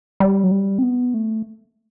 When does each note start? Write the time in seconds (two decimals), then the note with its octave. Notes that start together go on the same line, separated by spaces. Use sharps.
0.20 G3
0.44 F#3
0.51 G3
0.79 C4
0.83 B3
1.14 A3